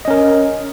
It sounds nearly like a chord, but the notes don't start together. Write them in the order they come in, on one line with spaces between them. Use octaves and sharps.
D#5 C#4 A#4